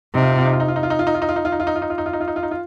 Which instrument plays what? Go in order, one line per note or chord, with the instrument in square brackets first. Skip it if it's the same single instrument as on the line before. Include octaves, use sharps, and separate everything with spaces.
[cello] C3 [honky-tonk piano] D#4
[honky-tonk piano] F4
D#4
F4
D#4
F4
D#4
F4
D#4
F4
D#4
F4
D#4
F4
D#4
F4
D#4
F4
D#4
F4
D#4
F4
D#4
F4
D#4
F4
D#4
F4
D#4
F4
D#4
F4